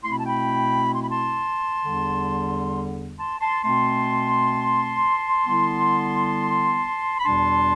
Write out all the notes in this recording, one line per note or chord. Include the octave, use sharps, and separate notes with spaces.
B2 A3 C4 E4 C6
B5
A5
G5 B5
C6
B5
A5 C6
E2 D3 G3 D4
A5 C6
A5 C6
B2 A3 C4 A5 C6
D3 G3 B3 E4
B5
E2 B2 G3 D4 A5 C6